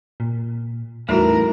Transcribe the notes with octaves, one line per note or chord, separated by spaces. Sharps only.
A#2
E2 A2 E3 G3 A3 D#4 F#4 A#4